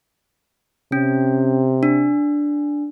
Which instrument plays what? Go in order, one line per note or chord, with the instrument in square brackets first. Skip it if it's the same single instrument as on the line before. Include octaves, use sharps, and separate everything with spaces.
[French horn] C3 [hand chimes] C#4
[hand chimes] D4